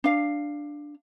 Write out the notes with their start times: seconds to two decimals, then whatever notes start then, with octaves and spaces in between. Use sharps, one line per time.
0.04 D4 F5